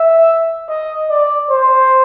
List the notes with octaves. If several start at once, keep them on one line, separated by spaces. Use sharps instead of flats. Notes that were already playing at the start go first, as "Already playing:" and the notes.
Already playing: E5
D#5
D5
C5